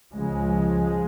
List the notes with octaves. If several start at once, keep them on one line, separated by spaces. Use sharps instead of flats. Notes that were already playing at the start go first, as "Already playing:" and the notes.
C#2 C#3 F3 G#3